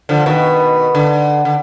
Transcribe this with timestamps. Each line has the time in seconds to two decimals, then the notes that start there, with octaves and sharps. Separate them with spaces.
0.09 D3 F3
0.26 B2 D#3
0.95 D3
1.45 D3